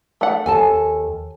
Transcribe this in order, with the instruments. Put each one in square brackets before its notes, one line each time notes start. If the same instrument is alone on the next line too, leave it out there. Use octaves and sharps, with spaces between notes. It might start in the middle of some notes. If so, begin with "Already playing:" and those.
[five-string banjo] A3 F#5
[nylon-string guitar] D#2 A4 A5 [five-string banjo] G#5